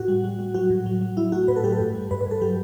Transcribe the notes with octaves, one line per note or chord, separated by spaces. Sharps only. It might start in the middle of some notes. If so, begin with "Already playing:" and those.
Already playing: A2 F#4
G3
G3
G3
F#3 F#4
A2
F#3
F#3
F#3 E4
A3 F#4
A2 B4
A4
F#3 G4
A4
G2
G3
G2 B4
B4
G2
A4
F#3 G4